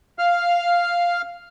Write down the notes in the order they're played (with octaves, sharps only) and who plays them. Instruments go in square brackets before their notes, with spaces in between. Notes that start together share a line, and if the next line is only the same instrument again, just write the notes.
[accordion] F5 F6